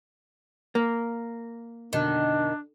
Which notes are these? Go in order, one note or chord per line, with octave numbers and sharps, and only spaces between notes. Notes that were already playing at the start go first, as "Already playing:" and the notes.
A#3
F2 B2 D3 D#3 D4